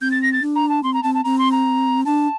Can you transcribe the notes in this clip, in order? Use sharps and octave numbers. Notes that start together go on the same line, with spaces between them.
C4 G6
A6
A#6
A6
D4
A#5
A5
C4 C6
A#5
C4 A5
A5
C4 A#5
C6
A#5
D4 A5